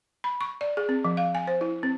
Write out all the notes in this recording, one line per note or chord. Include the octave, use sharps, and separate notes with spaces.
B5
C#6
D5
G#4
C4
F3
F5
G#5
C5
E4
C4